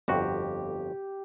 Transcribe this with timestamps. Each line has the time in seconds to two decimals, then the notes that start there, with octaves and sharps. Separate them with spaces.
0.08 G1 F2 F#4 G4